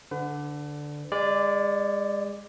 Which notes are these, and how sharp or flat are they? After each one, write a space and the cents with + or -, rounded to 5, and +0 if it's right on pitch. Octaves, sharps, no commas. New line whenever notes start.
D3 +0 B4 +40
G#3 -30 D5 +0